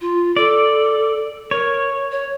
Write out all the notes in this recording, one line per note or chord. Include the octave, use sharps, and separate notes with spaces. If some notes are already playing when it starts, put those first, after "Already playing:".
F4
A4 D5
A#4 C#5
C#5